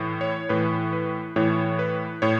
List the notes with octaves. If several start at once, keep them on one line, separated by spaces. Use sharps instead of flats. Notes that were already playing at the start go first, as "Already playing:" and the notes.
Already playing: A2 E3
C#5
A2 E3 B4
B4
A2 E3 C#5
B4
A2 C#5